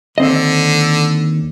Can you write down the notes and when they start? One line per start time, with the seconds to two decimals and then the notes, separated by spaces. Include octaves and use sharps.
0.18 D#2 D3 C4 D#5